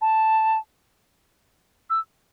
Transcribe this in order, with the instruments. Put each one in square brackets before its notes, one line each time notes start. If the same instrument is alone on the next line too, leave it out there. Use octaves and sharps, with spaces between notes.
[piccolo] A5
E6